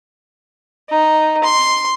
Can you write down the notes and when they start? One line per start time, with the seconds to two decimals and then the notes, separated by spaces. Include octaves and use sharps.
0.89 D#4
1.44 C6